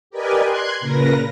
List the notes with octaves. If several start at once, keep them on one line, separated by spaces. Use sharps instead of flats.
G4 A#4 B4 D5 D#5 G#5
C6 F#6 G#6
A#2 C#3 A#4 B4 A#6